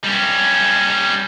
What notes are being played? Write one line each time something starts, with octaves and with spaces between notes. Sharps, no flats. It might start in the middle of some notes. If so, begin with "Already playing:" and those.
G3 C#4